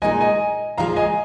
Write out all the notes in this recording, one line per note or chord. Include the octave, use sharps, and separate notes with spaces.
A#2 G#3 D#4 A#4 D#5 G#5
D#5 G#5
A#2 F3 G#3 F4 F5 A#5
D#5 G#5